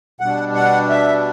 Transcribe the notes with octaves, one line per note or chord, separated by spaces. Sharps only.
B2 G3 D4 F#5
F#5
E5